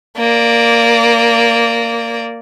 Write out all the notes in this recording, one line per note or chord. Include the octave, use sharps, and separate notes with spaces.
A#3 D5